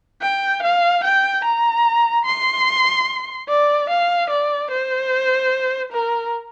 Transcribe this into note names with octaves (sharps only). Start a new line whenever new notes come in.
G5
F5
G5
A#5
C6
D5
F5
D5
C5
A#4